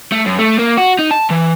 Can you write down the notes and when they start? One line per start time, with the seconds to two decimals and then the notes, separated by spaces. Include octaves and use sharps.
0.12 A3
0.26 F#2
0.39 A3
0.58 A#3
0.77 F#4
0.99 D#4
1.11 A5
1.31 E3